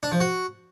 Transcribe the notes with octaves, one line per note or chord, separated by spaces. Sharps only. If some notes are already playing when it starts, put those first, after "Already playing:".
D4
F3
F#4